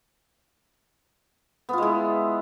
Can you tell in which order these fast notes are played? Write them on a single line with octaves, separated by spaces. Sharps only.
B3 F4 G#3 E4